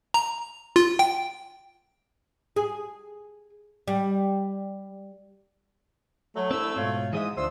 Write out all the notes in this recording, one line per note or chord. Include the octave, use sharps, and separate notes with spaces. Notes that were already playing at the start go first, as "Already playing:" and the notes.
A#5
F4
G5
G#4
G3
F#3 A3
C2 C4 D4 E4 E6
G#2 B2 F4 C#5
G#2 E3 G#3 E5 D#6
D2 F3 D4 C5 E6